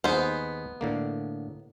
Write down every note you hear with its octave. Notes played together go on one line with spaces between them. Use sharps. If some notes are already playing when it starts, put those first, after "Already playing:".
D#2 B3 D#4 G#4 C5
A2 D3 A#3